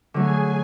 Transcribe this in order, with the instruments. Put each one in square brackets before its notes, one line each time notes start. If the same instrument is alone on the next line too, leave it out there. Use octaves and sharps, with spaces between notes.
[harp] D3 F#3 A3 [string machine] G#4 G#5